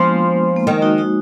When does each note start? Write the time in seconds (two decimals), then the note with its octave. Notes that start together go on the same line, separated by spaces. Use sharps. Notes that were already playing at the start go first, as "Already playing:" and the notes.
Already playing: F3 G#3 A#3 B3 D4
0.56 A#3
0.67 D#3 G#3
0.82 D#4 F#4
0.98 D#4 F#4